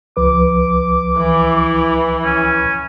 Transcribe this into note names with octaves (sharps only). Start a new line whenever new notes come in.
C#2 F3 B4 D6
E3
C#4